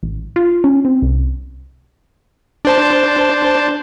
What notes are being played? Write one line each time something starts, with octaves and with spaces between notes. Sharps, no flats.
A1
F4
C#4
C4
C2
D4 C5 A5